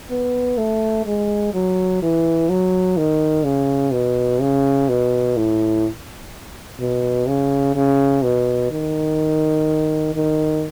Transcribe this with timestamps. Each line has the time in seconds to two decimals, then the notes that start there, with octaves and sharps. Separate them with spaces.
0.10 B3
0.57 A3
1.06 G#3
1.54 F#3
2.02 E3
2.49 F#3
2.97 D#3
3.45 C#3
3.93 B2
4.41 C#3
4.89 B2
5.37 A2
6.80 B2
7.28 C#3
7.76 C#3
8.23 B2
8.71 D#3
10.15 D#3